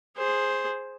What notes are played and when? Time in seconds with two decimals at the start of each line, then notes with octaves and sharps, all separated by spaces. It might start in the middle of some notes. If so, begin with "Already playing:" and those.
0.17 G#4 C5